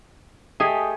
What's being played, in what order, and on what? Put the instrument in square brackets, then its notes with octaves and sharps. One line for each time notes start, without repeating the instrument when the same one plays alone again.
[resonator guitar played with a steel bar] A3 G4 D#5 [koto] G#4